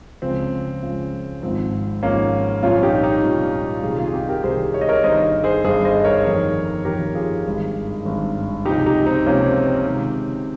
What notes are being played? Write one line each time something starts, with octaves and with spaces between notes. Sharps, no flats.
C#2 C#3 F3 C4
C#2 C#3 F3
G#1 G#2 F3 C4
G#1 G#2 F3 A#3 C#4
C2 A#2 F3 C#4 F4
D#4 G4
D#4 G4
C2 A#2 F3
C2 C3 D#3 F4 G#4
F4 G#4
D#4 G4
G4 A#4
C2 C3 D#3 G#4 C5
C#5
D#5
A#4 C#5
G1 G2 D#3 C5 D#5
G#4 C5
G1 G2 D#3 G#4 C5
C5 D#5
A#4 C#5
G1 F2 D#3
G1 F2 D#3 G4 A#4
F4 G#4
G#1 G2 D#3
G#1 G2 D#3
C#2 C3 F3 D#4 G4
D#4 G4
C4 D#4
C#2 C3 F3 A#3 C#4
C4
C4
C#2 C3 D#3